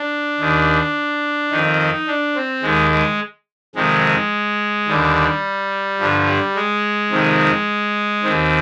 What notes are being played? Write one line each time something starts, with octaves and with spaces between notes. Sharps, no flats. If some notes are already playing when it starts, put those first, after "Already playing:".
Already playing: D4
D#2 D#3
F2 D#3 D#4
D4
C4
D#2 D#3 G#3
G#3
F2 C3 D#3 G#3
D#2 D3 G3
G2 D3 F3
G3
G#3
F2 C3 D#3
D#2 D#3 C4